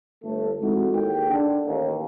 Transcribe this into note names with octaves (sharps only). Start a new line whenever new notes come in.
G1 A3
E3 G#3 C4 D#4 F#4 A4
D#2 G#4 A4 G5
D3
A1 D#2